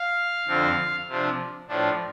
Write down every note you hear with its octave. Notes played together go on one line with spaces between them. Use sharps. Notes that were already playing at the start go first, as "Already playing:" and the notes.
Already playing: F5
F2 D3 F3 C4
C3 F3 D4
A2 F3 D4